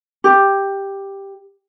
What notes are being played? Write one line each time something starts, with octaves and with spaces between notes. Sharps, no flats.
G4